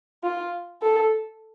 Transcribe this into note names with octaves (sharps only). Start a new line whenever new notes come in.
F4
A4